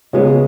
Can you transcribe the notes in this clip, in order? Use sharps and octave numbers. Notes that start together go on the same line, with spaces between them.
C#3 G#3 B3 G#4 C#5